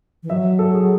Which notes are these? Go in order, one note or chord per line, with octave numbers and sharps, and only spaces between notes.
E3
F#3 E5
A4
G#4